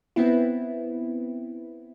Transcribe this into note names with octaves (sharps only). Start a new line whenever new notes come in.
B3 C4 E4